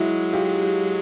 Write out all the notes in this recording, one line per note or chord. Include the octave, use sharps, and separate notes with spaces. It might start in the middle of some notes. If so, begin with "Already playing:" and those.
Already playing: F#3 G#3 E4 F#4
F4 G4